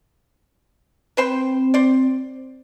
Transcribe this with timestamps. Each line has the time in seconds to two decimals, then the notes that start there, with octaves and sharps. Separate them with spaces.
1.17 C4 B4 C5 G5
1.74 C5 D5